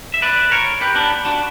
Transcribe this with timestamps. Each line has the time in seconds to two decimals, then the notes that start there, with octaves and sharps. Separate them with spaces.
0.14 E5
0.22 B4 D5
0.51 A#4 C#5
0.81 G4 B4
0.95 B3 D4
1.25 D4 F#4